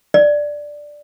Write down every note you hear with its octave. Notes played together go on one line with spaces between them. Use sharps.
D5